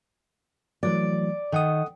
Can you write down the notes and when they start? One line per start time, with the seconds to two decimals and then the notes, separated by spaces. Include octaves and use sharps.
0.83 E3 F#3 A3 D5
1.52 D#3 A4 F#5 D#6